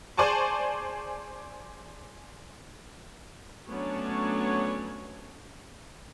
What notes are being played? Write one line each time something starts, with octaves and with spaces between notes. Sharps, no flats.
G#4 C5 D5 G#5 A5 C#6
F#3 A3 B3 C#4 D4 C#5